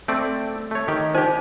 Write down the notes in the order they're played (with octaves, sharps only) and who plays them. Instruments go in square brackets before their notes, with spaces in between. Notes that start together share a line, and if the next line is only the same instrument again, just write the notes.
[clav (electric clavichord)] A3 C4 D5
A3 C#5
D#3 G4
[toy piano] D#4 C5 [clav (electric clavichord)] G4 G#5